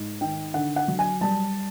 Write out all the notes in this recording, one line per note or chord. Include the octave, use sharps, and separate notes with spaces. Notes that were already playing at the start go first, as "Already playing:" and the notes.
Already playing: G#2
D#3 G5
D3 F#5
F#5
F#3
G#5
G3 A5